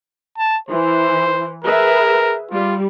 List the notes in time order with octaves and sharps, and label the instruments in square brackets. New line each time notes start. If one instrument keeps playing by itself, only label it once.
[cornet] A5
[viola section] E3 [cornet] C5
[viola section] G#4 B4 E5 [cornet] A#4
[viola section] G3 [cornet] F4